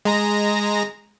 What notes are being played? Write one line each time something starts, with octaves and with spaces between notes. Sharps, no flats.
G#3 A#5 A#6